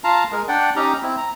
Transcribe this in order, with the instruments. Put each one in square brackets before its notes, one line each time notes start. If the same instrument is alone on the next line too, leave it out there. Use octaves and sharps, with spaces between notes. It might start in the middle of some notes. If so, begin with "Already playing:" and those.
[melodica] F4 F5 A5 A#5
G#3 A#4
D4 D5 F#5 G5
C#4 D#4 G4 A#5
C4 E4
A#5